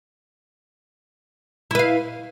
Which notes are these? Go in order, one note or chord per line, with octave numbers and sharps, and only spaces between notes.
E4 B4 F5